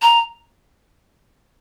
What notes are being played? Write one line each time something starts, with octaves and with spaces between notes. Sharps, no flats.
A#5